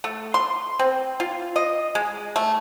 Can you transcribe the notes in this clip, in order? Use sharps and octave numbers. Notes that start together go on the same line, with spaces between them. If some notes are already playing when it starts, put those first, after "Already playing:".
A3
C6
C4
F4
D#5
G#3
A3